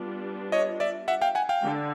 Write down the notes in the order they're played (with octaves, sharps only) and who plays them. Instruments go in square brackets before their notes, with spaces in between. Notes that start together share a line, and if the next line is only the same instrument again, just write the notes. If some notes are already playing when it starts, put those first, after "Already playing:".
Already playing: [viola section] G3 B3 D4 F4
[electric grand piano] C#5 D#5
D5 E5
E5 F#5
F5 G5
F#5 G#5
F5 G5
[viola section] D3